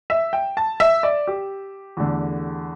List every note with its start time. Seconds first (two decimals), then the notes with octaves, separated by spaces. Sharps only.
0.10 E5
0.33 G5
0.57 A5
0.80 E5
1.03 D5
1.27 G4
1.97 E2 D3 A3